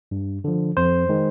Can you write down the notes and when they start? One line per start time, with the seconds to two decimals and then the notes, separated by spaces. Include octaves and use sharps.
0.11 G2
0.44 D3 F3
0.77 F2 C5
1.09 D#3 G#3